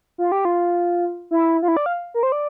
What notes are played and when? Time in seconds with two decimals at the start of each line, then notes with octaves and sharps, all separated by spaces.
0.18 F4
0.32 G4
0.45 F4
1.31 E4
1.62 F4
1.68 E4
1.77 D5
1.86 F5
2.14 A#4
2.23 C5
2.32 D5